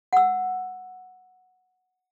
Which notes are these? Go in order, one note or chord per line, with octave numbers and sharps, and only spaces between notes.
F#5 E6